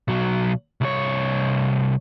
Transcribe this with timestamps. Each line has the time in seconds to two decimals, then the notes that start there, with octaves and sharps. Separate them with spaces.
0.08 B1 F#3
0.81 C2 C#5